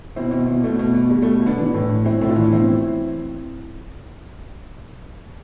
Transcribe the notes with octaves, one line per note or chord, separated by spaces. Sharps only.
B2 C4 E4
B2
B2
B2 A3
B2
B2
B2 G3
A3
B2
B2 B3 D4
E3 B3 D4
A2
E3
E3 C4 E4
A2
D4 F4
E3
B2 C4 E4